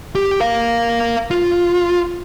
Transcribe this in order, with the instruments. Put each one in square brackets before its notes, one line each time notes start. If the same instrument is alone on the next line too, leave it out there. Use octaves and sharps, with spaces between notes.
[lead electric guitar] G4
A#4 F5
F4